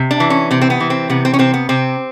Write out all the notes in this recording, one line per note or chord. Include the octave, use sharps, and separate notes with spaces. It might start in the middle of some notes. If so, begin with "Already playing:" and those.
Already playing: C3
D4
E3
C#4
C3 C4
C4
B3
E3
C4
C3 B3
C4
C#4
C3 C4
B3
C3 C4